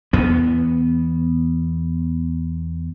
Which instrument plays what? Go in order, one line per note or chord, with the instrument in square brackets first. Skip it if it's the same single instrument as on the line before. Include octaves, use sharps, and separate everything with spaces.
[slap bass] E2 B3